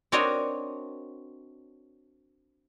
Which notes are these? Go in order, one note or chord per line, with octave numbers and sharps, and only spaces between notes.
C4 D4 F#4 A#4 C#5 D#5